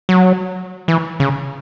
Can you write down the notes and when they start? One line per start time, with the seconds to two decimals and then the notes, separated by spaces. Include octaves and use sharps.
0.09 F#3
0.88 E3
1.20 C#3